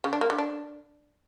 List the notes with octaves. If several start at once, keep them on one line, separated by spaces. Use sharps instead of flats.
C#3
D4
A#3
D3
D4